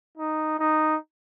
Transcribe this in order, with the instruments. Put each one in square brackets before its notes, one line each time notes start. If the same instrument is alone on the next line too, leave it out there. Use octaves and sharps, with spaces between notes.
[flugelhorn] D#4
D#4